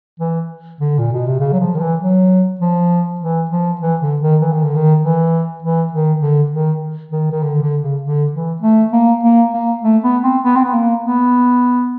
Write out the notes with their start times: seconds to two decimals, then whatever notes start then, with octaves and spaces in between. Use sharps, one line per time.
0.20 E3
0.80 D3
0.99 A#2
1.13 B2
1.27 C3
1.40 C#3
1.53 F#3
1.60 F3
1.75 D#3
1.80 E3
2.01 F#3
2.61 F3
3.21 E3
3.51 F3
3.81 E3
4.01 D3
4.22 D#3
4.41 E3
4.53 D#3
4.64 D3
4.76 D#3
5.02 E3
5.62 E3
5.93 D#3
6.21 D3
6.52 D#3
7.12 D#3
7.32 D#3
7.43 D3
7.62 D3
7.82 C#3
8.03 D3
8.33 E3
8.62 A3
8.93 A#3
9.24 A#3
9.54 A#3
9.83 A3
10.04 B3
10.24 C4
10.44 B3
10.56 C4
10.65 B3
10.74 A#3
11.04 B3